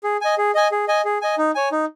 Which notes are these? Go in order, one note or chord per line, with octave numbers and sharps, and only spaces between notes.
G#4
D#5 G#5
G#4
D#5 G#5
G#4
D#5 G#5
G#4
D#5 G#5
D#4
C#5 G#5
D#4